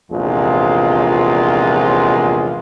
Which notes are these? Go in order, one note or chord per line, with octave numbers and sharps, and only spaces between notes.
A#1 E2 C3 G#3 F4